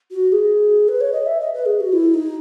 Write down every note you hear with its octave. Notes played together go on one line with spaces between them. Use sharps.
F#4
G#4
B4
C#5
D#5
E5
D#5
B4
G#4
F#4
E4
D#4